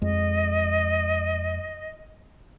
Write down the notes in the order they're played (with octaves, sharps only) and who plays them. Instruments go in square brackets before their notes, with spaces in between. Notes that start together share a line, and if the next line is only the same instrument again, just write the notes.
[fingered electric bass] F2 G#3 [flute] D#5